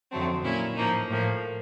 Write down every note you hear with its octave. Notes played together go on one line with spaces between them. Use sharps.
F2 D3 F#3 A3 C4
A#2 F#3 A#3 C#4 E4
A2 F3 A#3 D#4
A2 F3 A#3